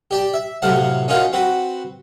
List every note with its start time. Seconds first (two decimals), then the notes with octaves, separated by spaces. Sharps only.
0.11 G4 D5 A5
0.34 E5
0.62 A2 C3 F#3 F5 F#5 A5
1.08 C#4 D#4 F4 F#4 A#4 F5
1.33 C4 F#4 B4